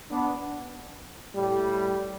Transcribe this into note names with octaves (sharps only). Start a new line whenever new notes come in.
B3 D4
A2 G3